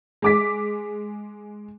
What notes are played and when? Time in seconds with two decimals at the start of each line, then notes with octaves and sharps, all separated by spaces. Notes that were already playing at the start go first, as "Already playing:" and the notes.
0.22 G#3 D6 B6